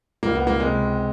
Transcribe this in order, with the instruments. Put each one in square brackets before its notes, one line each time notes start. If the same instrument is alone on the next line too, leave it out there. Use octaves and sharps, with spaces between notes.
[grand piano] C#2 A#3
B3
A#3
C3 G#3